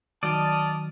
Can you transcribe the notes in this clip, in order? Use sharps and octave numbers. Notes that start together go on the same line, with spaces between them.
D#3 F#3 D5 D#5 A5 D#6 F6